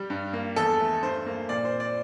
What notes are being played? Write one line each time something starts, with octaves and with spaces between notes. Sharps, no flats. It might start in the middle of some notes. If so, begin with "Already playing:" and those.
Already playing: G3 G4
G2
A#3
E2 A4
A3
G2 C5
A#3
A#2 D5
C5
C4
D5